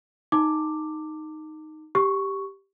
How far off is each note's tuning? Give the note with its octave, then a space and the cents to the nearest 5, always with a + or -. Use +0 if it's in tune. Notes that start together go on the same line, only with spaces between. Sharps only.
D#4 +0 A5 +45 D6 +0
G4 +0 C#6 +0